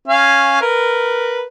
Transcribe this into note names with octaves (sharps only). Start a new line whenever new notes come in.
C#4 F5
A#4 B4